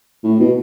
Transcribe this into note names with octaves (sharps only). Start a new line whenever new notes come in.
A2
B2